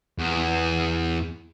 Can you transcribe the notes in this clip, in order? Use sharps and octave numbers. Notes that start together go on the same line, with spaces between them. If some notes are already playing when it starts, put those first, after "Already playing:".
E2